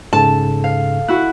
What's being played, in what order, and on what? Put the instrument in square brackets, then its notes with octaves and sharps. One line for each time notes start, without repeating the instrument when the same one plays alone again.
[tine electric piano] G#2 C#3 [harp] A4 [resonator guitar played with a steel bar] A5
[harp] F5
[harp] E4 F#4 [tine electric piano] F#6